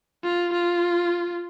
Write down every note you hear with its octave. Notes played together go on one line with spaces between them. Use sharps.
F4
F4